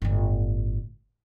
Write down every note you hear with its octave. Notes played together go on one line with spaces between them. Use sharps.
G1 A2